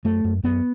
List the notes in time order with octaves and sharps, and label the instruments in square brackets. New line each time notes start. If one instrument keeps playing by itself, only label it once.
[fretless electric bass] F#2 A3
F#2
F#2 B3